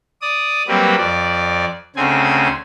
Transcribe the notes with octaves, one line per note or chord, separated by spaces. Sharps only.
D5 D#6
F#3 G3 A#3 C4 G4 B4
F2 D5
D2 C#3 C4 G#5